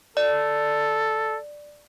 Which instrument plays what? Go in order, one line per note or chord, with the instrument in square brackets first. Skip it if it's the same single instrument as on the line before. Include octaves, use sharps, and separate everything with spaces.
[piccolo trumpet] A4 [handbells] D5